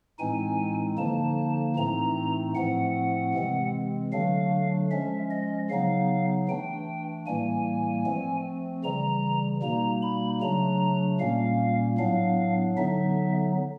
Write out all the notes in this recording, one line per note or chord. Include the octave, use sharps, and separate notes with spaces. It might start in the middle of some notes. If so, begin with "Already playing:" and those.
A2 E3 G#3 C4 D#4 G#5
D3 F3 A#3 D#4 A5
A2 E3 A3 C4 D#4 A#5
A2 F3 A3 C4 F#5
C3 E3 G#3 C4
D3 F#3 A3 D4 F5
F3 G#3 C#4 E5
D#5
C#3 F#3 B3 D#4 F5
E3 A3 D4 G5
A2 E3 G3 A#3 G#5
F3 A3 C4
C#3 E3 G3 A#5
B2 G3 A#3 D#4 A#5
B5
C#3 F#3 A3 D4 A#5
A#2 G3 A#3 C#4 F5
A2 F#3 B3 D4 F5
D3 F#3 B3 D#4 E5